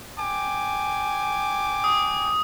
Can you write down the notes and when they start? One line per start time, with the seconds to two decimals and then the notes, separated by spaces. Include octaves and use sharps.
0.19 G5 G#5 D6
1.84 D#6